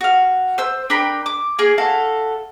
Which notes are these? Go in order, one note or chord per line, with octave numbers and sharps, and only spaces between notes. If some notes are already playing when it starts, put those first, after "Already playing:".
F#4 F5
C5 E6
D4 A#4 G5 B5
D6
A#3 G#4 G#5
E4 F#4 A4 F5